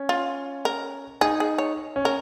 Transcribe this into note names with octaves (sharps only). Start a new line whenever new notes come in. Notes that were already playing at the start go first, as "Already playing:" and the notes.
Already playing: C#4
F4
A#4
D#4 G#4
G#4
C#5
C#4
A#4